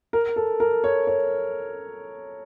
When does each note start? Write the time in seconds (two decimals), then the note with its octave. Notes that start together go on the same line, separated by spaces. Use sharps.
0.13 A#4
0.36 A4
0.60 A#4
0.84 C#5
1.07 C#5